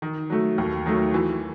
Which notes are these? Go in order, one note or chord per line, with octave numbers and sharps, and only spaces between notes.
D#3
F#3 A3
D#2
D#3 F#3 A3
E3